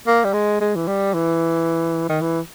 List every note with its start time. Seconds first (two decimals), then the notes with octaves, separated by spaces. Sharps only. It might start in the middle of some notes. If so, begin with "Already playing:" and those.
0.07 A#3
0.24 G3
0.34 G#3
0.61 G#3
0.76 E3
0.87 G3
1.14 E3
2.09 D#3
2.21 E3